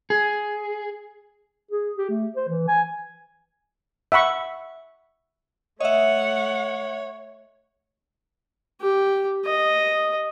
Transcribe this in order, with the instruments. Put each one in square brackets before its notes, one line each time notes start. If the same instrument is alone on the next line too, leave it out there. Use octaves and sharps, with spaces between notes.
[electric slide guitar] G#4
[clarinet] G#4
G4
A3
C5
E3
G#5
[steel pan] E5 F#5 B5 C#6
[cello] A3 F#5 [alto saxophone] C#5 [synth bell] D#5 E5
[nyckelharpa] G4
D#5